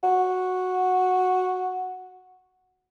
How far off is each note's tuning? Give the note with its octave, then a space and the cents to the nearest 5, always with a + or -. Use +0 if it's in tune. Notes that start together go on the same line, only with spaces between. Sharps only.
F#4 -5